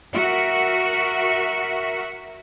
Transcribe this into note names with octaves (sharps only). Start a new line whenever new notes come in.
F#4 A#4 E5